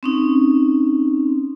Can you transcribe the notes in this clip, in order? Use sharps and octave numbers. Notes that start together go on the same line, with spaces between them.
C4 C#4 D#4